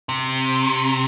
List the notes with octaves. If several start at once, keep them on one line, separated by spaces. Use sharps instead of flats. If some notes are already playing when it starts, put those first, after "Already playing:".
C3